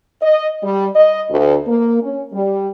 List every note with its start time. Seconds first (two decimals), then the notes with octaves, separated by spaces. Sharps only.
0.22 D#5
0.63 G3
0.96 D#5
1.30 D2
1.67 A#3
2.02 C#4
2.33 G3